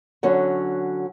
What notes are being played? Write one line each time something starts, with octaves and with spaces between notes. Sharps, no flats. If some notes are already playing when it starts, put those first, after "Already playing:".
D3 F#3 C#4